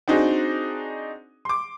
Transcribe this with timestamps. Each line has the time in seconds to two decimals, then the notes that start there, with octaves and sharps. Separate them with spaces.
0.08 C4 D4 D#4 F#4 G#4
1.45 C6 D6